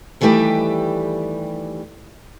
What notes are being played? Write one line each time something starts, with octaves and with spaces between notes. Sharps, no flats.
D#3 E3 G3 A3 G4 B4